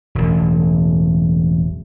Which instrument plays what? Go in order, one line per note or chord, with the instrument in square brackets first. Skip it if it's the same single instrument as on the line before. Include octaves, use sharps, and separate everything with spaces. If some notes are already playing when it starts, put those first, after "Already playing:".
[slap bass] E1 A1